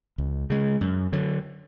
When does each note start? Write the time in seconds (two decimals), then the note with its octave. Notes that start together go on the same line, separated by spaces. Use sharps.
0.18 C#2
0.50 C#3 G#3
0.81 F#2
1.13 D3 F#3